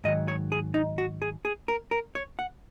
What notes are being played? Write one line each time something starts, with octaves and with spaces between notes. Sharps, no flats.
G#2 D#3 F#3 D#5
C#5
G#4
D#4
F#4
G#4
G#4
A#4
A#4
C#5
F#5